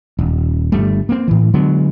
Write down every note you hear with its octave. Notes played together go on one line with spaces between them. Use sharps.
D#1
G1 G3 A3
A#3 C4
A2 E3
D3 F#3 G#3 B3